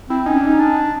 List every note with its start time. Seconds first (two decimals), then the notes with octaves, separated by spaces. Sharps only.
0.09 C4 E4
0.26 C#4 D#4
0.37 D4
0.47 D#4
0.59 D4